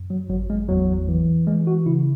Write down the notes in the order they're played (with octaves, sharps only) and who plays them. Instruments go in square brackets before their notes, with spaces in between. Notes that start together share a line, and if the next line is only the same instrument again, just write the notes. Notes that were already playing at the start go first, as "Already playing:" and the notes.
Already playing: [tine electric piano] F#2
F#3
G#1 F#3
G#3
E2 F#3
E3
E3 G#3
F#4
C#3 E4